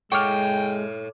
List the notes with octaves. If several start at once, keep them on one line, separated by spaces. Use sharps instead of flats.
G#3 A4 C#5 G5 C#6 D6 F6